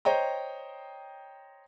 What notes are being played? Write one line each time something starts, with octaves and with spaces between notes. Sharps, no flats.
C5 C#5 D#5 G5 A#5